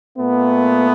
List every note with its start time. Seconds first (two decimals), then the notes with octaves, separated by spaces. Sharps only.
0.18 A#2 A3 B3